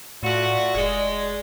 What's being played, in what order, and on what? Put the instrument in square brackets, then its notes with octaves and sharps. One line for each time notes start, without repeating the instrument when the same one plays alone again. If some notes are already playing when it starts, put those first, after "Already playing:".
[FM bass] A2 [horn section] A3 F4 F#4 [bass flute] D5
[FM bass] F1 [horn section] G#3